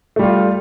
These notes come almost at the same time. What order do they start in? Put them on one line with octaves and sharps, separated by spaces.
A3 G3 F4